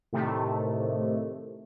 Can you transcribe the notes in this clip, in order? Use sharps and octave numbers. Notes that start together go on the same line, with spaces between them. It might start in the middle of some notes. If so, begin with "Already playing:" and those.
A2 C3 D#3 A3